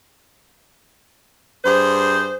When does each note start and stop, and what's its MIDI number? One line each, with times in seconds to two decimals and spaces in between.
1.65 2.37 43
1.65 2.37 68
1.65 2.37 72